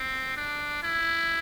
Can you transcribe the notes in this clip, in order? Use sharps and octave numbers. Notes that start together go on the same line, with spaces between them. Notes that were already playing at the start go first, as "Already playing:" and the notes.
Already playing: C4
D4
E4